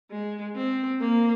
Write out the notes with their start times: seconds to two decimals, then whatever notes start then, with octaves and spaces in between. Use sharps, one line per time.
0.11 G#3
0.56 C4
1.00 A#3